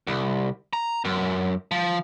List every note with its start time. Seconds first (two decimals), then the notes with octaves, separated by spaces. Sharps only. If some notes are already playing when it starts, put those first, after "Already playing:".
0.07 C2
0.73 A#5
1.05 F#2
1.71 F3